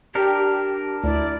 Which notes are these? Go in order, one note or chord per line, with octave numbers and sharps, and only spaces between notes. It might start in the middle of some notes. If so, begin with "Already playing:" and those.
D4 G4 A#4
G4
D2 E4 D5